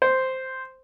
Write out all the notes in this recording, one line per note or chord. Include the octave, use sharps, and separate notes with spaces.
C5